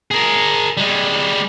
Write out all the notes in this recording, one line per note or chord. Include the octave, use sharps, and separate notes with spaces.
G#4 A#4
G3 G#3